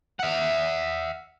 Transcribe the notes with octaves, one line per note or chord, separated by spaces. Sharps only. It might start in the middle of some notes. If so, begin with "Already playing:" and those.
E5 F#5